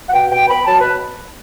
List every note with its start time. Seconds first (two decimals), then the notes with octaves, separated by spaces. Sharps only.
0.09 F#5
0.13 B2 G5
0.30 B2 G5
0.48 B3 B5
0.66 F#3 A5
0.79 B2 B4